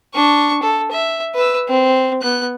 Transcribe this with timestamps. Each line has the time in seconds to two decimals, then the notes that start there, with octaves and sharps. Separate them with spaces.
0.14 D4 C#6
0.63 A4
0.92 E5
1.35 B4 E6
1.68 C4
2.22 B3 F#6